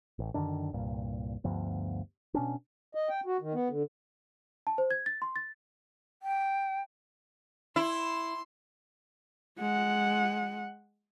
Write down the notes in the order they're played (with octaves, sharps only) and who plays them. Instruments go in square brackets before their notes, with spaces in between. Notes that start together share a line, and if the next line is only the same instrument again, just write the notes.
[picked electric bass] A1
F#2 D3 D#3 D4
C2 G2 A#2
D2 G2 F3 B3
B2 C#4 D4
[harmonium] D#5
G5
F#4
D#3
B3
D3
[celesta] A5
C5
G#6
A6
C6
A6
[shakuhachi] G5
[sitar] E4 [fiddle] C6
[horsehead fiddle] G#3 F#5